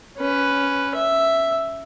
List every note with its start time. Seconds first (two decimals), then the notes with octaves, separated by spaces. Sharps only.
0.17 C#4 B4
0.95 E5